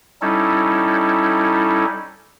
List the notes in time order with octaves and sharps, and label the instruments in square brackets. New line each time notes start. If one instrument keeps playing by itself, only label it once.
[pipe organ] G3 C#4 D#4 E4 A4